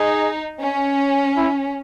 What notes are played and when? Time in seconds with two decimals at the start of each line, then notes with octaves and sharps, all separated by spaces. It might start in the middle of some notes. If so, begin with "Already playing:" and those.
Already playing: D#4 G#4
0.61 C#4
1.37 E4